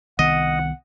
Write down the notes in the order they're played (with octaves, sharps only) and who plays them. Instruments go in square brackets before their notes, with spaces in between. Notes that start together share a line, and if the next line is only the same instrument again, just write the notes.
[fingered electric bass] C2 D#3 B3 [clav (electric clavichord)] D#5 [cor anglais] F#5